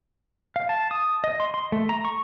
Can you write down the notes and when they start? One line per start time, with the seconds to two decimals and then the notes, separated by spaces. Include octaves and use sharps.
0.56 F5
0.69 A5
0.91 D#6
1.24 D#5
1.40 C6
1.54 C6
1.72 A3
1.89 A#5
2.05 C#6